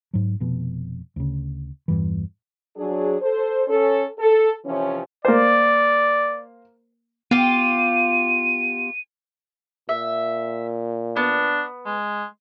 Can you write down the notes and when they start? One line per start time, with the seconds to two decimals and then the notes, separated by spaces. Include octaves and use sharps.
0.14 G#2 F#3
0.40 F1 F2 B2
1.16 D2 C#3
1.88 E2 G2 E3
2.75 F#3 D4 G#4
3.20 A4 C5
3.68 C#4 A4
4.17 A4
4.64 C3 E3 F3 C#4
5.25 A#3 C5 D5
7.31 B3 F4 G4 D#7
9.89 A#2 E5
11.16 B3 D4
11.86 G#3